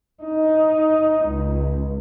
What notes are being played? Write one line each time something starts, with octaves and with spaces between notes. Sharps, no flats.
D#4
C#2